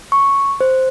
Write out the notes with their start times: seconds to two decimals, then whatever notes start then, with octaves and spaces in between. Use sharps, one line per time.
0.12 C#6
0.61 C5